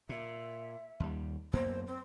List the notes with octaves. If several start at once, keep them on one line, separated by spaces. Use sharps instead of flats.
A#2 E5
D#2 G3
F#2 A#3 B3 C5
C4